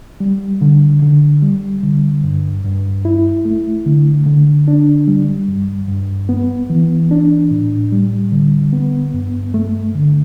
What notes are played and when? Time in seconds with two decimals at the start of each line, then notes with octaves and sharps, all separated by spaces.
0.20 G3
0.61 D3
1.02 D3
1.42 G3
1.83 D3
2.24 G2
2.64 G2
3.05 E4
3.45 A3
3.86 D3
4.26 D3
4.68 D4
5.08 G3
5.48 G2
5.89 G2
6.29 B3
6.70 E3
7.11 D4
7.51 A2
7.92 G3
8.32 D3
8.73 B3
9.13 G2
9.54 A3
9.94 D3